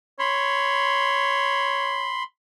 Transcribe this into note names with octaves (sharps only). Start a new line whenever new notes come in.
C#5 B5 C6